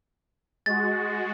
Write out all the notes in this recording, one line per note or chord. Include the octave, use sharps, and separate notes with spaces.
G#3 F#4 A6